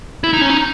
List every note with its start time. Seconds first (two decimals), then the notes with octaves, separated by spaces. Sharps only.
0.24 E4
0.33 D#4
0.41 C#4
0.50 D#4